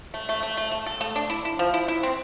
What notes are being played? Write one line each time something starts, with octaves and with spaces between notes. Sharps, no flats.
A3
A3
A3
A3
A3
A4
A3
D4
E4
E4
F3
E4
E4
C4